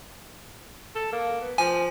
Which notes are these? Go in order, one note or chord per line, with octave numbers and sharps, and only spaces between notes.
A4
A#3
B3
F3 G#5